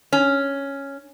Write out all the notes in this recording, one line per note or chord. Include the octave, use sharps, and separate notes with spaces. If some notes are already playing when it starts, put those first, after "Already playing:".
C#4